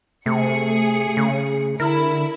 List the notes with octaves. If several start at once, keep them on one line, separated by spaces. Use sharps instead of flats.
C3 A3 G#4 C#7
C#3
D3 E4 A#4